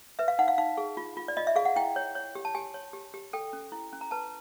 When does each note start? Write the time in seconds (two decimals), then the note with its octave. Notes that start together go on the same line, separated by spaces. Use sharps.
0.19 B4 E5
0.28 F5
0.39 D#4 F#5
0.48 F5
0.58 D#4 F5
0.78 G#4
0.97 F4
1.17 F4
1.28 D5
1.37 F4 D#5
1.47 E5
1.56 G#4 F5
1.65 F#5
1.76 E4 G5
1.96 C#5
2.15 C#5
2.35 G4
2.45 A5
2.55 G4 G#5
2.74 C#5
2.93 G4
3.14 G4
3.33 A4 G5
3.53 C#4
3.72 E4
3.93 C#4
4.01 A#5
4.11 B4 A5